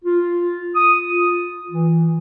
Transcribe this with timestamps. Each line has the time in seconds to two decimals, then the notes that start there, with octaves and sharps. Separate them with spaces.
0.04 F4
0.75 D#6
1.08 F4
1.71 E3